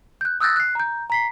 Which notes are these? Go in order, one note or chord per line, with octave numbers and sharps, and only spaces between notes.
F#6 G6
D#6 E6 F#6 G6 A6 A#6
F#6 C7
A#5 G6
A#5 B6 C7